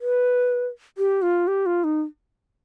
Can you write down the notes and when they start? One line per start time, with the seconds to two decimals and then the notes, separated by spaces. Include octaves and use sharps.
0.01 B4
0.98 G4
1.22 F4
1.47 G4
1.66 F4
1.84 D#4